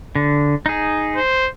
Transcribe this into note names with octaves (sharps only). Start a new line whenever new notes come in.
D3
D#4 G#4
C5